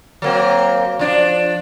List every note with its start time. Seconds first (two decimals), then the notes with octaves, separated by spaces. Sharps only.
0.22 F#3 A#3 C4
0.99 F3 D4